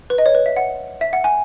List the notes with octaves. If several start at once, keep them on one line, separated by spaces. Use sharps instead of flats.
B4
D#5
C#5
B4
E5
F#5
E5
F#5
G#5